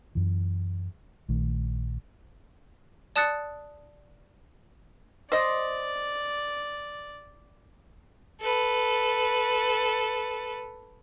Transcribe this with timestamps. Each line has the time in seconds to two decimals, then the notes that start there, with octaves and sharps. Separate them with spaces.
0.15 F#2 E3
1.29 A#1 D#3 A3
3.16 D5 A5 D#6 F#6 A6 C#7
5.32 C5 D5 D#5
8.41 A4 B4